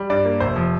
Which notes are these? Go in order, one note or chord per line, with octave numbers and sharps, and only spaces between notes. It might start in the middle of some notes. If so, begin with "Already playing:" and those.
Already playing: G3
G2 D5
A#3
F1 C5
F3